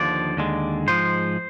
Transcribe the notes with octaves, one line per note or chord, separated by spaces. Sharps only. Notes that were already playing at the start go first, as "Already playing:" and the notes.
Already playing: D#2 D3 F3 D5
D#2 D3 G#3
G#2 F3 G#3 C5